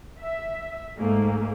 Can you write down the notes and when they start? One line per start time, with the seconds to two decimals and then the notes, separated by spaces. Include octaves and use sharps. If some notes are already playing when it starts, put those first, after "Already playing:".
0.21 E5
0.99 G#2 A3 A#3